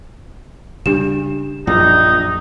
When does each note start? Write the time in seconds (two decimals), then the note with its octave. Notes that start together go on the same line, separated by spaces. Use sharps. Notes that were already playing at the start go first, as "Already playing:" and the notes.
0.86 C#3 G3 D4 G4 E7
1.67 A#1 F#2 D#4